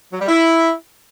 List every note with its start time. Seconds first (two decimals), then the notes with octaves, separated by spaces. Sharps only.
0.13 F#3
0.21 G3
0.28 E4